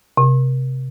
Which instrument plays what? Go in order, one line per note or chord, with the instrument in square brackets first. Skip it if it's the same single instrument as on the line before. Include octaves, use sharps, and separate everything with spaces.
[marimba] C3